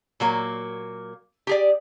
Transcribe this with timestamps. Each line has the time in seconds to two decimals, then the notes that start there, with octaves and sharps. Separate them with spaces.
0.20 A#2 F#3 A#3
1.47 G4 G#4 D5